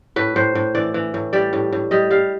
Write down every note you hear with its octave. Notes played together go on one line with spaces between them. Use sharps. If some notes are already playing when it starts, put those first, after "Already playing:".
A2 B4
A2 C5
A2
E3 D5
E3
A2
G3 D5
A2
A2
G3 D#5
G3 F5